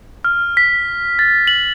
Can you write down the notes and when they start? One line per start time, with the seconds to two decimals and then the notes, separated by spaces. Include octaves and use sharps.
0.25 F6
0.57 B6
1.19 A6
1.47 F#7